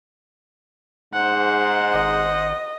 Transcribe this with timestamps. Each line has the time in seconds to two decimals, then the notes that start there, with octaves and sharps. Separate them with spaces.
1.14 G#2 C5 F#5
1.94 G#1 D#5